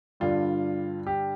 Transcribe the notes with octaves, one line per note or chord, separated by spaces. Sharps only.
G2 D3 G3 F4
G4